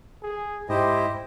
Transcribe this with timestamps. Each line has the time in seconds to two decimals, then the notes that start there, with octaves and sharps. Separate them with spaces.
0.23 G#4
0.69 G#2 E4 G4 C5 D#5